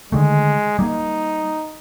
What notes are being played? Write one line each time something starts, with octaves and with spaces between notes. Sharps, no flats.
D3 D#3 G#3 A3
G3 A#3 D#4